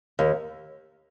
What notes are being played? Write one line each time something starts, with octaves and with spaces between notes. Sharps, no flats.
D#2